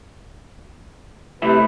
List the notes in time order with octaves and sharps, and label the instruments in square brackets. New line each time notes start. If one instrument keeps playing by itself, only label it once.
[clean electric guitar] A2 G3 E4 [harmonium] C3 [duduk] B4